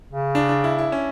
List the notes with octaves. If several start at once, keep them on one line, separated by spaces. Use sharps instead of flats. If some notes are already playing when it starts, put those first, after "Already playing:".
C#3
D4
D4
E4
E4
C#4